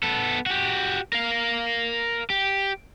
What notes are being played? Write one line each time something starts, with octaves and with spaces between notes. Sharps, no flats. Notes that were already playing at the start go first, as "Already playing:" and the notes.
B3 A4
F#4 G4
A#4 F5
G4